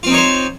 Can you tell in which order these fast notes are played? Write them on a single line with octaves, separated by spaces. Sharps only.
F4 C4 D#4 C#5 C5